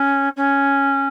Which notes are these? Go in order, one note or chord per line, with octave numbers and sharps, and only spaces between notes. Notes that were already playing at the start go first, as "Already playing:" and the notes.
Already playing: C#4
C#4